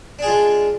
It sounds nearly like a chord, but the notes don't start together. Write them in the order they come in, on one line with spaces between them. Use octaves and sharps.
D4 G#4 F4 G#3